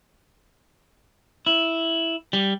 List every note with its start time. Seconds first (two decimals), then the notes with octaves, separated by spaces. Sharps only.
1.47 E4
2.33 G3